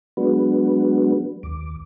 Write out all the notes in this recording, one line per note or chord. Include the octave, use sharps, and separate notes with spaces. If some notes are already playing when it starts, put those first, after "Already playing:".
F#3 G#3 B3 D4 F#4 B4
D#2 D6